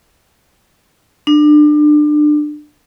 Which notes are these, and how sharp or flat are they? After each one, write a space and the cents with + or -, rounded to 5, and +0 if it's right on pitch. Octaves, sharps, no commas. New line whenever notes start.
D4 +30